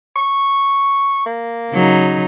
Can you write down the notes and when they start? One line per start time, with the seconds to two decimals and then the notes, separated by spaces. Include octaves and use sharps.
0.16 C#6
1.26 A#3
1.71 C#3 F#3 D#4